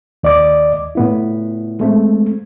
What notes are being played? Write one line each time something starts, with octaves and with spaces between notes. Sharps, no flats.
D#2 D5 D#5 D6
A2 B3 E4
G#3 A3 C4